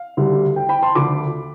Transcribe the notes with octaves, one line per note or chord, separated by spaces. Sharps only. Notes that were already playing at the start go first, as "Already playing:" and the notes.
Already playing: F5
D2 D3 G3
G5
G5 B5
A5 C6
D2 D3 F3 B5 D6